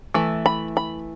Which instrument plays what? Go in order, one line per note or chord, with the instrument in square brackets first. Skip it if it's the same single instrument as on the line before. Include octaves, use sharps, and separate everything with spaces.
[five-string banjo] E3 A3
B5
B5